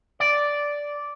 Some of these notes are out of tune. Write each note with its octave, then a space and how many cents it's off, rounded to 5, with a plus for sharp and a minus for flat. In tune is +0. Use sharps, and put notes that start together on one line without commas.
D5 -5